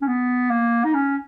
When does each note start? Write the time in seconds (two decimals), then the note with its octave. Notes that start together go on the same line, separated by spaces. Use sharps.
0.02 C#4
0.08 B3
0.51 A#3
0.84 D#4
0.94 C#4